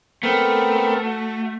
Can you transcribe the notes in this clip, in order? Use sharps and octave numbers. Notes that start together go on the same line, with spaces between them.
A3 B3 C4 A#4
F#4